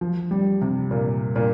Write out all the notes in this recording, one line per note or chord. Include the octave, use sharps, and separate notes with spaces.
F3
G3
C3
A#2
A#2